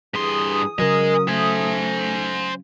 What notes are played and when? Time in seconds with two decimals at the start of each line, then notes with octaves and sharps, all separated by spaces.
0.14 G2 D3 E3 G#4 C6 D#6
0.79 C#3 F#3 A#4 D#5 G#5
1.28 A3 C5 G#5